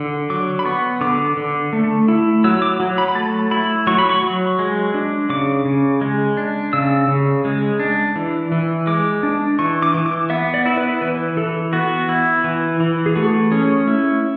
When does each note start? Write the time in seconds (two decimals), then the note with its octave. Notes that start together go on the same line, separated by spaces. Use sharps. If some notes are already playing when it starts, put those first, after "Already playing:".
Already playing: D3
0.30 F#3 D6
0.59 B5
0.65 B3 C#6
1.01 D3 D6
1.37 D3
1.73 A3
2.08 E4
2.44 F#3 E6
2.62 D6
2.80 F#3
2.98 B5
3.08 B5
3.15 A3 A5
3.51 E4 B5
3.87 F#3 C#6
3.98 B5
4.09 C#6
4.22 F#3
4.59 G#3
4.94 D4
5.30 C#3 D6
5.65 C#3
6.01 G#3
6.37 D4
6.73 C#3 E6
7.08 C#3
7.45 G#3
7.80 D4
8.16 E3
8.52 E3
8.87 G#3 D6
9.23 D4
9.59 E3 C#6
9.82 D6
9.94 E3
10.06 D6
10.30 B3 E5
10.54 D5
10.66 E4
10.77 B4
11.01 E3 B4
11.37 E3 A4
11.73 B3 F#4
12.09 E4
12.44 E3
12.80 E3
13.06 G#4
13.15 A3 F#4
13.52 C#4 G#4
13.88 E4